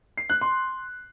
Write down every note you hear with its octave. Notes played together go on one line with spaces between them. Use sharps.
C7
F#6
C6